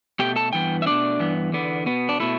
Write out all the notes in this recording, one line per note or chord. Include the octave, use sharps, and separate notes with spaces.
B2 A3 G4 G5
A4 A5
G2 E3 B3 G5
E5
B2 A3 D4 D5
G2 E3 B3
E2 D3 B3
B2 B3
D4
B2 A3 E4